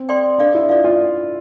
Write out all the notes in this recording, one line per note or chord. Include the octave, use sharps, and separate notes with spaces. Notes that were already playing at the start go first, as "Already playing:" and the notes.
Already playing: C4
A4 D5 G5 C6
D4 A4 D5 F5
E4
F4 A4 D5 F5
F4